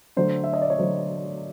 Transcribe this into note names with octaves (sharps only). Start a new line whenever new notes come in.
D3 F#3 A3 C5
E5
D#5
D5
C#5
D3 F#3 A3 C5